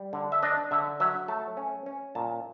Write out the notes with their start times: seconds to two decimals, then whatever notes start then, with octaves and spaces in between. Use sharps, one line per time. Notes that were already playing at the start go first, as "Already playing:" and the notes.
Already playing: G3
0.13 D3
0.32 E5
0.43 D4 D#5
0.71 D3 E5
1.00 F#3 E5
1.28 A3 A5
1.57 C#4
1.86 C#4
2.15 A#2 A5